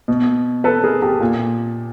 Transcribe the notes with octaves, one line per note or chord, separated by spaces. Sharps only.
B2
A4 B4
G#4 A#4
G4 A4
A#2